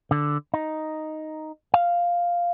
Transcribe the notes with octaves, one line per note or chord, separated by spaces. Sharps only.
D3
D#4
F5